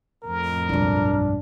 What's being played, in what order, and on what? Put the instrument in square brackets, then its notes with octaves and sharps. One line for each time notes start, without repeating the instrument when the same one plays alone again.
[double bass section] F2 A2 [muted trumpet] A#4
[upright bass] B1 G2 [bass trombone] D4